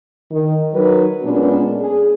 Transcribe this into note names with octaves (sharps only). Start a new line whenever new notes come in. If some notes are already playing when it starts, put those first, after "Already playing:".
D#3
F#3 D#4 A#4 B4
A#2 G#3 B3 C#4 D4
G#4